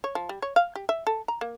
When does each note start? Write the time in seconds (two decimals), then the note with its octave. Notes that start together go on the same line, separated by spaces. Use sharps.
0.04 C#5
0.15 F3
0.29 G3
0.42 C#5
0.56 F5
0.76 G4
0.89 E5
1.07 A4
1.28 A#5
1.41 A#3